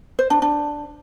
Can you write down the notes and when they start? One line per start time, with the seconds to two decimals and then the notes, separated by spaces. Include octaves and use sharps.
0.19 C5
0.30 D4
0.42 D4